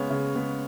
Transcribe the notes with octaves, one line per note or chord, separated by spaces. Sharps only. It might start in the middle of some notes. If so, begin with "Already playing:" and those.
Already playing: C#3 G#3 B3 C#5
C#3
G#3 B3